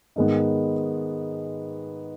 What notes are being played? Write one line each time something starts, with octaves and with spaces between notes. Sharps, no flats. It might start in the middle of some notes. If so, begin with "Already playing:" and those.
G#2 D#3 G#3 B3